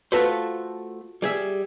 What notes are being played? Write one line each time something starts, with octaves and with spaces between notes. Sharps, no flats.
A3 F4 F#4 A4 B4 C5
G3 G#4 E5